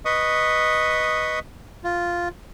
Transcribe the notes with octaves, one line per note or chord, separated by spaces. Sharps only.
B4 D#5 C#6 D#6
F4